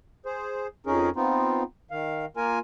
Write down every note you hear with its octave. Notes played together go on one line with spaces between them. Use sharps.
G#4 C5
F2 C#4 D#4 G#4 A#4
B3 C4 D#4 F4
D#3 F5
A#3 F4 A#4 G#5